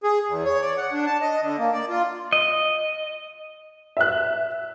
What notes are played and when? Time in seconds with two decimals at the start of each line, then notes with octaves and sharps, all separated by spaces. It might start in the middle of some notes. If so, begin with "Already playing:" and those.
0.04 G#4
0.27 E2
0.45 C#5
0.62 D5
0.77 F#5
0.92 D4
1.06 A5
1.22 D#5
1.41 D3
1.58 A#3
1.72 D5
1.89 F4
2.33 D#5
3.97 E5 F#6